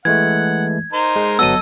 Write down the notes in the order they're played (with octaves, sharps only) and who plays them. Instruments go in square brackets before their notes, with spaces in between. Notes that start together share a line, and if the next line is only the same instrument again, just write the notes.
[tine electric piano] E3 G#3 A3 [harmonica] F#5 [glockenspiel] G#6
[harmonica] D#4 A#4 C5
[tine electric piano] G#3
[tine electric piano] G1 F#3 B3 [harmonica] A4 D#5 [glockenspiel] E6 D#7